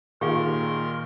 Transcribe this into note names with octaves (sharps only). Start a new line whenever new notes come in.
A#2 D#3 G4 G#4 A#4 F5 C6